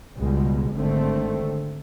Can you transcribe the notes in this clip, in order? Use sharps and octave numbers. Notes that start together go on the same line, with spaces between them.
C#2 B2 G3 G#3
G#1 D3 D#3 A3 C4